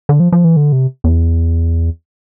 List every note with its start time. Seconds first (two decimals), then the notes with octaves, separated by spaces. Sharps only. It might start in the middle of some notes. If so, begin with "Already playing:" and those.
0.09 D3
0.20 F3
0.32 F3
0.44 E3
0.56 D3
0.72 C3
1.04 E2